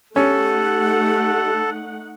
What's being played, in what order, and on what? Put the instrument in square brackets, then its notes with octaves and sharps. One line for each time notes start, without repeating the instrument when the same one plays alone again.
[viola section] A3 D#4 F#5 [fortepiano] C#4 [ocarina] G4 [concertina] A4